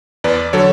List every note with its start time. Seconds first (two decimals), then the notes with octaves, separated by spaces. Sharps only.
0.24 E2 B4 D5
0.53 D3 F#3 A4 C#5